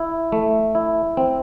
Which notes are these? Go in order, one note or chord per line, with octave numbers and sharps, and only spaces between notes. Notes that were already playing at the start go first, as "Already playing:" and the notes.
Already playing: E4
A3
E4
C4